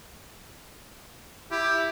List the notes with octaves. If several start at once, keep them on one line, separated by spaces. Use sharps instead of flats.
E4 G4